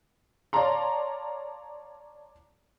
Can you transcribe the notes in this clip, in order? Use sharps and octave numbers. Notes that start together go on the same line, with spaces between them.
C#5 D5 F5 A5 A#5 C6